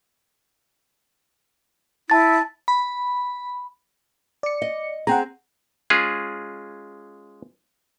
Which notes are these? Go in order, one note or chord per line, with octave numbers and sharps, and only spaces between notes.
E4 A5 A6
B5
D5 C#7
D#5
C4 G#4 F#5 G5 A#5
G#3 C#4 F4 G#4